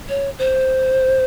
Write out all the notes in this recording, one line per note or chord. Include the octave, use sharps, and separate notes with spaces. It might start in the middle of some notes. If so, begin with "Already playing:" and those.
C#5
C5